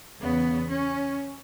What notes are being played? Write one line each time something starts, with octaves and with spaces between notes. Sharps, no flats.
E2 C#3 E3 B3
C#4